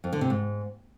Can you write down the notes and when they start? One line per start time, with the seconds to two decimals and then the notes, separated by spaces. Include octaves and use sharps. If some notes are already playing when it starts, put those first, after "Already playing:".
0.04 F2
0.13 D3
0.21 C3
0.30 G#2